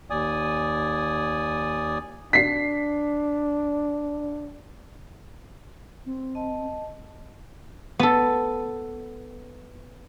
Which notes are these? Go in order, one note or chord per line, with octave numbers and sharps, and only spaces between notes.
D#2 D5 G#5 D#6
D4 B6 C7
C4
D#5 A5
B3 A4